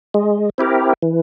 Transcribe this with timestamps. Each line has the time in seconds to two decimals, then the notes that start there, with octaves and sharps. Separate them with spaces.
0.14 G#3
0.58 C4 E4 G4 A#4
1.02 E3